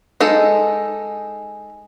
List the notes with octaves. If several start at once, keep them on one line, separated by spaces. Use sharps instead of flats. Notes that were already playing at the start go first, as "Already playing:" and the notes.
G#3 D#4 A4